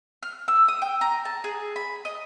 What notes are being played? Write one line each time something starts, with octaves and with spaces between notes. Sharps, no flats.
F6
E6
D#6
G5
A#5
A5
G#4
B5
D#5